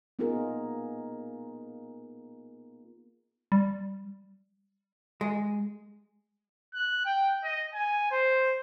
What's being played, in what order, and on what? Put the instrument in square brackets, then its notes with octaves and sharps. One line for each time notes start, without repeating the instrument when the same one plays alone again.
[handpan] A#3 B3 D#4 F4 G#4 A#4
[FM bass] G3
[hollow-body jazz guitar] G#3
[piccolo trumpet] F#6
G5
D#5
G#5
C5